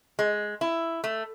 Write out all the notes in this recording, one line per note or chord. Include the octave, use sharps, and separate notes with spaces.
G#3
E4
A3